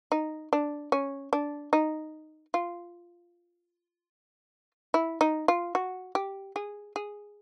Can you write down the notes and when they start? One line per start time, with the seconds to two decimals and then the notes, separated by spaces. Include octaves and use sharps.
0.12 D#4
0.53 D4
0.92 C#4
1.33 D4
1.73 D#4
2.54 F4
4.94 E4
5.21 D#4
5.48 F4
5.75 F#4
6.15 G4
6.56 G#4
6.96 G#4